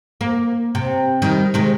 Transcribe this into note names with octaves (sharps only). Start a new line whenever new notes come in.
A#3
C3
D#3 G3
C3 D#3 G#3